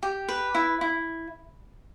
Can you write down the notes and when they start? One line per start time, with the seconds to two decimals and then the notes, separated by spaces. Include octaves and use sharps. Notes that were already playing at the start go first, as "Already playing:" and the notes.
0.03 G4
0.29 B4
0.55 E4
0.81 E4